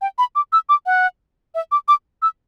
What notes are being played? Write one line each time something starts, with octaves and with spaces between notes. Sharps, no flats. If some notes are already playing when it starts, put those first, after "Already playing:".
G5
B5
D6
E6
D6
F#5
E5
D6
D6
E6